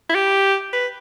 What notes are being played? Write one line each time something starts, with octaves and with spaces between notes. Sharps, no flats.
E4
G4
B4